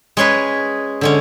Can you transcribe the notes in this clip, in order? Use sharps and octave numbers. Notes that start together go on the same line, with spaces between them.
G#3 C#4 G#4 B4
D3 G#3 C#4